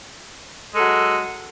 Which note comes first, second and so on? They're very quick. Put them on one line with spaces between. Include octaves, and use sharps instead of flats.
G#3 A4 F#3